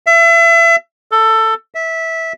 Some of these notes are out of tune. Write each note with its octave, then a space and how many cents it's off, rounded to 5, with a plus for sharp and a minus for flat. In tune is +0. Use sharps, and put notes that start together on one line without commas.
E5 +30
A4 +15
E5 -15